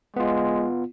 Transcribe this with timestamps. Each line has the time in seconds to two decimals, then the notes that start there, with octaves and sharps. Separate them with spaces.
0.16 G#3 B3 F4